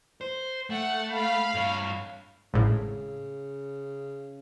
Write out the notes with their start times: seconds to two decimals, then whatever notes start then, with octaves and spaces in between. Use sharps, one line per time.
0.21 C5
0.70 A3 F#5
1.12 F5 B5
1.54 G2 C#5
2.54 G#1 A2 C#3